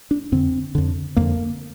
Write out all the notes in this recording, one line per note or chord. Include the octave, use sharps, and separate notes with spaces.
D4
F2 D3 C4
F2 D3
F2 D3 A#3